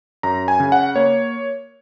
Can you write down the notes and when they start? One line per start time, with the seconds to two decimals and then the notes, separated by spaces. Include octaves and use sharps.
0.23 F#2 A#5
0.48 G#5
0.60 C#3
0.72 F#5
0.96 A#3 C#5